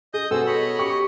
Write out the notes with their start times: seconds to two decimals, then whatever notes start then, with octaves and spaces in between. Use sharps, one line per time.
0.14 G#4 D#5 D#6 G6
0.31 B2 G#4 A4 C5 E6
0.47 C#5 D#5 B5
0.79 G4 C#6